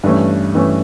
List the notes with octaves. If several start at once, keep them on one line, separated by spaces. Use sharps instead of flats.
G2 E3 A3 C#4
G2 E3 A3 C#4